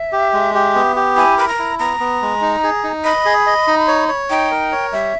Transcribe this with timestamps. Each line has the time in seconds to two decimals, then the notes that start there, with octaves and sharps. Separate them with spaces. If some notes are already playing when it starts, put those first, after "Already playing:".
Already playing: E5
0.12 G4
0.33 G#3
0.54 G4
0.75 B3
0.96 G4
1.16 E4 G#5
1.38 A#4 B5
1.48 A#5
1.59 E4
1.79 B3 A#5
2.00 B3
2.22 G#3
2.41 D#4
2.63 G#4
2.84 D#4
3.05 D#5 B5
3.25 G#4
3.46 D#5
3.67 D#4
3.88 C#5
4.09 C#5
4.30 D#4 G5
4.51 A#4
4.72 C#5
4.92 G3 E5